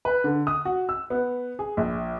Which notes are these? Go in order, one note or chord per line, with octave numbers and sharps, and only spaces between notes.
B4
D3
D#6
F#4
E6
B3
G#4
A#1